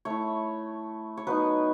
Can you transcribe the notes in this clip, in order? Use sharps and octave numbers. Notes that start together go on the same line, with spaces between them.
A3 E4 C#5
C#5
F#3 B3 D#4 B4